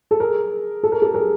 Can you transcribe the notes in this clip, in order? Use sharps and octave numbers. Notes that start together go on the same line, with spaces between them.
A4
G#4 A#4
A4
A#4
G4 A4
G#4 A#4